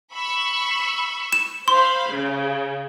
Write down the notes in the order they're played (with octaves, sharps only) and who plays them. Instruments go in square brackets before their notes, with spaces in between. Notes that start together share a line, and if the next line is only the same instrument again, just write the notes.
[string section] B5 C#6 E6
[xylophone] E7
[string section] C5 F5 B5 [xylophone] C6
[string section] C#3